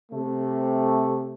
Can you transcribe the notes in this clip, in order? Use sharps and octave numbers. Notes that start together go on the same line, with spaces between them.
C3 A3